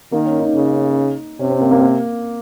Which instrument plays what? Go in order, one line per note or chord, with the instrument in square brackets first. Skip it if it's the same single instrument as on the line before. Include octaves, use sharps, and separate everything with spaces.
[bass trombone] D#3 [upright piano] A#3
[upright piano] C#4
D#4
[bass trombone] C#3
[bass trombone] C3 [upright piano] C#4
[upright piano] C4
A#3
A#3
A#3